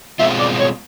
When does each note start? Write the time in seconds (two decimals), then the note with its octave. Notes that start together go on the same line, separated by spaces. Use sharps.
0.19 B2 G#3 C4 F4 E5
0.40 D5
0.60 C#5